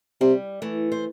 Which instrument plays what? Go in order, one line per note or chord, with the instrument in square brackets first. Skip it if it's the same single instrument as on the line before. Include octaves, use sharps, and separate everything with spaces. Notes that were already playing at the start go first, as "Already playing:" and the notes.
[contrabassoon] C3 [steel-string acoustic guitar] G3
[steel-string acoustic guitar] E3 A3
C5